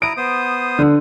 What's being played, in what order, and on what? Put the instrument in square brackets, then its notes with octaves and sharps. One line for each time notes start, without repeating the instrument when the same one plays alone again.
[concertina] E4 A#5 D#6 [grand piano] D7
[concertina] B3 C5 D#6
[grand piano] D3